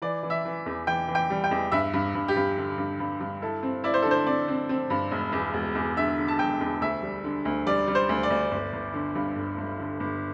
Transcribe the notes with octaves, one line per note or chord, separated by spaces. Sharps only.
E3 D5
E3
E5
E3
E2
E3 G5
E3
G5
G3
G5
E2
G2 E5
G2
G2
G4
G2
D3
G2
G2
G2
E4 A4
C4
E4 D5
C5
D3 A4
C5
C4 D5
C4
C4
G2
E1
E2
E1
E2
D3 E5
D3
A5
E1 G5
E2
D2 E5
G3
D3
D2
G3 D5
G3
C5
D2
D5
D2
G1
G1
D3
G2
G1
G1
D3
G1